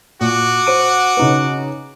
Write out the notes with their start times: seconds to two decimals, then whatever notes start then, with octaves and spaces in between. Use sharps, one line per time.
0.21 A#2 F#4 F#5 D6
0.67 C5 D7 D#7
1.17 C#3 D#4 B4